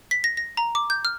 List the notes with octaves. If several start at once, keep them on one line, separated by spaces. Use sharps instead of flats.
B6
A#6
A#6
A#5
D6
G6
F6